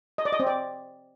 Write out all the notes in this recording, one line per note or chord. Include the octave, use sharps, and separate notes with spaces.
D#5
D5
D#5
C4
D5